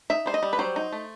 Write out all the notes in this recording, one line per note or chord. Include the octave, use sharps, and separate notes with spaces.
D#4 E5
G3 C5
D#5
G3
B4
F#3 C5
D#4
A3